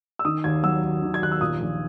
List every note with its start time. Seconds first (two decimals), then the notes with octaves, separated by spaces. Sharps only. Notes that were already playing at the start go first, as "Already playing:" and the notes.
0.19 E6
0.25 D#3 D#6
0.44 D#2 G#6
0.63 F#3 E6
0.83 D#2
1.02 D#3
1.14 G#6
1.22 D#2 F#6
1.32 E6
1.41 A#2 D#6
1.60 A#1